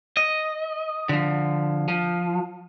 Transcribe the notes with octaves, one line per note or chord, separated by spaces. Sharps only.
D#5
D3 F3
F3